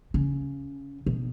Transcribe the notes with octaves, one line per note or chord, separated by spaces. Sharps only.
C#3
B2